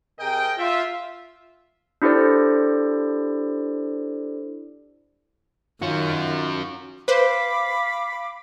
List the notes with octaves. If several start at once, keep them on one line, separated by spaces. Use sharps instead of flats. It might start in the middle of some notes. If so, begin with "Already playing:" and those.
C3 G#4 A#4 D#5 G5
F4 E5
D4 E4 G4 A4 C5 D5
D#3 C#4 F4 F#4
B4 C5 F5 B5 D6